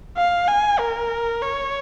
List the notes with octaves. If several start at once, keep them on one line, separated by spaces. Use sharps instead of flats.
F5
G#5
A#4
C#5